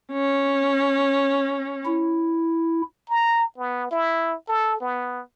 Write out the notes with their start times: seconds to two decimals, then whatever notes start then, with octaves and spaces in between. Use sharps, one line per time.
0.12 C#4
1.86 E4
3.09 A#5
3.58 B3
3.91 E4
4.48 A4
4.81 B3